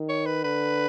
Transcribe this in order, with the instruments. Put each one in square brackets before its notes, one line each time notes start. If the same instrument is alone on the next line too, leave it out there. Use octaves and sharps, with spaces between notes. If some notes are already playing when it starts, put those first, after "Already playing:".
Already playing: [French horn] D#3
[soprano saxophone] C#5
B4
[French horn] D3 [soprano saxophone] B4